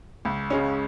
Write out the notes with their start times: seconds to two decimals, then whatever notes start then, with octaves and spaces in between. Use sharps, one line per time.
0.25 C#2
0.50 C#3 G#3 C#4